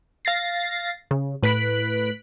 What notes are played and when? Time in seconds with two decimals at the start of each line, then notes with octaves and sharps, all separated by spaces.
0.25 F5 A6 A#6 C7
1.11 C#3
1.43 A2 B4 F#6 B6 D7